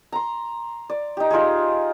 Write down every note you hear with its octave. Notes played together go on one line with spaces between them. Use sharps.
A#5 C6
D5
D#4 G4
D#4 F4 G4 G#4